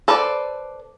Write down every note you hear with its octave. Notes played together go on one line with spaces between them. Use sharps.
A4 B4 C5 D5